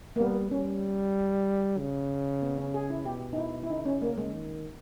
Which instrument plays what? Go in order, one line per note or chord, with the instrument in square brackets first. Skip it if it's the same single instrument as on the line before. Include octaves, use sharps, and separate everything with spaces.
[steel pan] A#3
[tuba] G3 [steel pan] B3
[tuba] G3 [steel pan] C#4
[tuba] C#3
[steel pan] B3
C#4
G#4
E4
[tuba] B2 [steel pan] G4
[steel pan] D#4
E4
E4
[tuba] C#3 [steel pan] D#4
[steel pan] C#4
A#3
G#3
[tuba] D#3